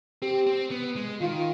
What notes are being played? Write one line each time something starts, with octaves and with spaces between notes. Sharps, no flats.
C4 G4
C4
B3
G#3
D#3 F4